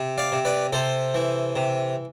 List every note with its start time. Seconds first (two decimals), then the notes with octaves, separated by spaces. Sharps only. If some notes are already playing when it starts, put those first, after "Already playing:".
Already playing: C3
0.18 D5 F5
0.32 C3
0.45 B4 D5
0.73 C3 A4 C5
1.14 E3
1.56 C3